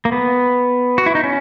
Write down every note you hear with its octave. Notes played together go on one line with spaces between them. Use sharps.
A#3
B3
F#4
E4
D#4
C#4